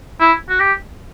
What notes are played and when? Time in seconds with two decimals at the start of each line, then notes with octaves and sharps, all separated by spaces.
0.20 E4
0.49 F#4
0.60 G4